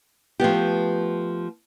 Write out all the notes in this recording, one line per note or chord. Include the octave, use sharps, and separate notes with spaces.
F3 A3 B3 G4